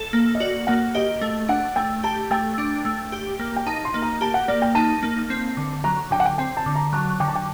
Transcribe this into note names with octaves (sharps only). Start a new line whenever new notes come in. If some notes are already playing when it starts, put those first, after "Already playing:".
Already playing: A4
A#3
D#5
F#4 D5
A#3 F#5
G4 D#5
A3
D4 F#5
A3 G5
G4 A5
A3 G5
D4
A3
G4
A#3
G5
D#4 A5
C6
A#3
A#5
G4 A5
F#5
A#3 D5
G5
D#4 A5
A#3
C4
D3
F#3 A#5
D3 G5
F#5
G5
C4 G5
A5
D3
A#5
F#3 A5
D3 G5
A5
G5